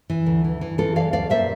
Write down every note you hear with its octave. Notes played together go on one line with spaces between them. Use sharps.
E3
D2
E3
E3
E3 F4 A4
E3 D5 F5
D2 D5 F5
A#2 C5 E5